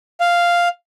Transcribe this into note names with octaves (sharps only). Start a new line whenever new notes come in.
F5